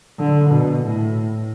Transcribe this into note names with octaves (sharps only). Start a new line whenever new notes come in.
D3
B2
A2